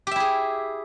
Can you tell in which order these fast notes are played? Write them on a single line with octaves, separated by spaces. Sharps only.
G4 E5 E4 G#4